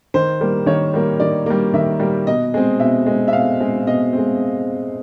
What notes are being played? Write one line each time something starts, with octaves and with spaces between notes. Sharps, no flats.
D#3 C5
G3 A#3
D#3 C#5
G3 A#3
D#3 D5
G3 A#3
D#3 E5
G3 A#3
B2 D#5
G#3 C4
B2 E5
G#3 C4
E5
B2 F5
G#3 C4
B2 D#5
G#3 C4